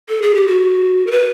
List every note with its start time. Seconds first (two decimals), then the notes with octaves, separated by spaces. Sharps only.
0.09 A4
0.22 G#4
0.35 G4
0.48 F#4
1.07 A#4
1.11 B4